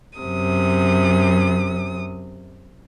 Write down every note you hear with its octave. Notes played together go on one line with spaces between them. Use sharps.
F#2 C3 D#6